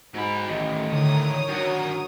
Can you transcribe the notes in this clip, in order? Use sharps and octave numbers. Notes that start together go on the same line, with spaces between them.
G#2 F#3 B5
A1 D#3 A3 D#5
A2 D3 A#4 C#5 D#6
D#3 F#3 D4 F#4